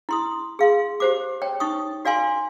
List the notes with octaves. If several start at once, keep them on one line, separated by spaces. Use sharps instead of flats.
E4 C6 D#6
G#4 F5 C6
G4 C5 D6
C#5 G5
D#4 C#6 D#6
F#4 D5 F5 G#5 C6